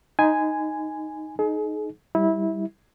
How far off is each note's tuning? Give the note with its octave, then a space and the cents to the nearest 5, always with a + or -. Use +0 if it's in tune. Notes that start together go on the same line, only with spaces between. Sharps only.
D#4 +0 G#5 +0 C6 -40
D#4 -5 G#4 +35
G3 +0 E4 -20